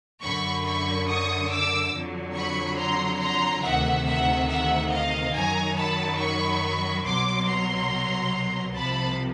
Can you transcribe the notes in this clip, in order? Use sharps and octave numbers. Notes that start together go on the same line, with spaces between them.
F#2 D3 F#3 B5 C#6
B5 C#6
C#6 D#6
D6 E6
F2 D3 F#3
B5 C#6
A#5 C6
A#5 C6
D2 C3 D#3 E5 F#5
E5 F#5
E5 F#5
D#5 F5
F#2 D#3 F#3 G#5 A#5
A5 B5
B5 C#6
C2 B2 F#3 C6 D6
A#5 C6
C2 C3 F3 A5 B5